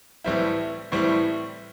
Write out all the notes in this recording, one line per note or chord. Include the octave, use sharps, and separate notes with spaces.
A2 E3 G3 C4 E4
A2 E3 G3 C4 E4